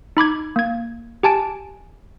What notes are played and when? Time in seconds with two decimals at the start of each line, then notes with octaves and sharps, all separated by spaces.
0.17 D#4 B5 D6 G#6
0.56 A#3 G#6
1.23 G4 G#5 A5 D7